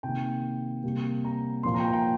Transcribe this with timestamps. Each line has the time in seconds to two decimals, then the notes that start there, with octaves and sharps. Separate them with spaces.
0.03 C3 D#3 A#3 G5
0.84 C3 G3 A#3
1.24 A#5
1.63 A#2 F3 A#3 C6
1.74 A#5
1.79 G5
1.84 A#5
1.93 G5